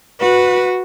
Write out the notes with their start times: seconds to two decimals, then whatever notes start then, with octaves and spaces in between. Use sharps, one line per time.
0.20 F#4 B4